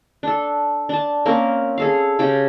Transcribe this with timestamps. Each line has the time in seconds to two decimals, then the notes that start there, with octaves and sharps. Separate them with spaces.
0.23 D4 A4
0.89 D4 A5
1.26 A#3 C4 C#4 A#4
1.78 G#4 A4 F5
2.19 C#3 G4 G5